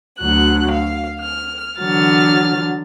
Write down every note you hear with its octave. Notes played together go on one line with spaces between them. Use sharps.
D2 F#3 F#6
F5
F6
D3 E3 F#3 F6 A6